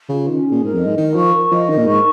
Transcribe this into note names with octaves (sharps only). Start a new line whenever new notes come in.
C#3 F4
D#3 C#4
G#4
A#2
G#2 A#4
F2
D#5
G#2
D#3 A#4
F3 C#6
A#4
F3 D#5
D#3 A#4
A#2
G#2 C#6